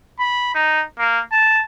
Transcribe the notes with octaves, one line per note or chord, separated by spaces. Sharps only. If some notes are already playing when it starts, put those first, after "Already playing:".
B5
D#4
A#3
A5